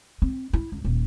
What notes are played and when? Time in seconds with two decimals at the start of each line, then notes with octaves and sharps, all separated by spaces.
0.22 C4
0.53 E4
0.72 C#2
0.84 D#1